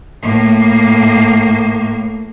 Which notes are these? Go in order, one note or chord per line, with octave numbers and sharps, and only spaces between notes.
A2 A#3